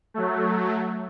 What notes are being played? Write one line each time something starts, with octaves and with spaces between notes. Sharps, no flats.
F#3 A3